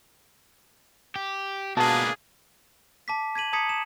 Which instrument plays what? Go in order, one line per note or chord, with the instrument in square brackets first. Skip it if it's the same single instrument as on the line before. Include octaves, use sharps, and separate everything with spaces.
[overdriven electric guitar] G4
[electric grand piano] B2 A5 [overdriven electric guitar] A#3 B4 [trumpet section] D4 F4 G#4
[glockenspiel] A5 D6 B6
G#6 B6 D#7 F#7
A5 A#5 D#6 G#6 B6 C#7
E7